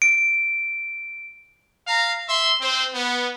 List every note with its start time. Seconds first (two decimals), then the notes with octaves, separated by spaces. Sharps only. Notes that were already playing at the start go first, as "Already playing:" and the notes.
0.02 D7
1.87 F5 A#5
2.29 E5 C6
2.61 C4 C5
2.94 B3